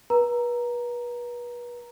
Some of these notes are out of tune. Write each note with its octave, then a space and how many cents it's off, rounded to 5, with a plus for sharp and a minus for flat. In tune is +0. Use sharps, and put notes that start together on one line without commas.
B4 -35 A#5 +0